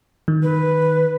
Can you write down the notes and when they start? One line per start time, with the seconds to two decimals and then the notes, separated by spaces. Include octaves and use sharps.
0.28 D#3
0.43 B4